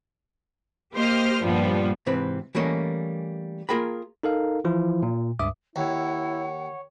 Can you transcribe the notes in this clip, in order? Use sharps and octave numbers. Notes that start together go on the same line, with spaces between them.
A#3 G4 C5 D#5 F6
G2 A#2 F3 G3 B3
G#2 C3 E3 C4 B4
E3 G3 A3 A#3 C#4 D#5
A#3 F4 G#4 A#4 G5 B5
D#4 A4 A#4 F5
E3 F3 E4 F4
A#2
C#2 G2 E5 D6 D#6
D#2 E4 C#5 F#5